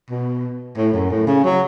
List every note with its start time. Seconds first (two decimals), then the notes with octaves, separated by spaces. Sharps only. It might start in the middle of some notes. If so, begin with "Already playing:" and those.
0.10 B2
0.77 A2
0.93 F#2
1.10 A2
1.27 C#3
1.44 F#3